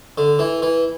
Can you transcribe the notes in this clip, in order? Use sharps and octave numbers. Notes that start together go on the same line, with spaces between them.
D3
E3
E3